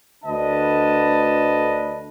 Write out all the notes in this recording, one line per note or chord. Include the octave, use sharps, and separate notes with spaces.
D2 D3 D4 B4 D#5 A5